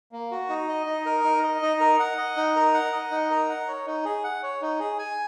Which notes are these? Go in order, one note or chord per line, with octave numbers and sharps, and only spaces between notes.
A#3
F#4
D#4
D#5
D#4
A#4
D#4
D#5
D#4
A#4
F#5
D#5
D#4
A#4
F#5
D#5
D#4
A#4
F#5
C#5
D#4
G#4
F#5
C#5
D#4
G#4
G#5